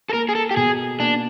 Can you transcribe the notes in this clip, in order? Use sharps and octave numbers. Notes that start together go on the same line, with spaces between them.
A4
A#3 A#4
G#4
A4
G4
B2 G#4
A#3 D4